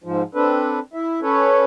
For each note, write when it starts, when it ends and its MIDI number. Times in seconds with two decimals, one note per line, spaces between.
0.04 0.23 44
0.04 0.23 53
0.35 0.79 60
0.35 0.79 62
0.35 0.79 69
0.35 0.79 71
0.93 1.20 64
0.93 1.20 76
1.22 1.65 61
1.22 1.65 69
1.22 1.65 71
1.22 1.65 73